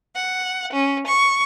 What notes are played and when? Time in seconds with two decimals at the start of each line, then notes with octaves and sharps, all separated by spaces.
0.15 F#5
0.73 C#4
1.07 C#6